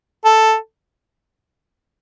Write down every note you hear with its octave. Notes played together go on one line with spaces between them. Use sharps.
A4